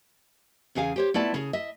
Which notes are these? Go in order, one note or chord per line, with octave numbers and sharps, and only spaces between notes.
E2 C#3 G#4 F5 G#5
G4 C5 C#5
A3 B3 E4 F4 D5 A5
C#3 G#4
D#5 E5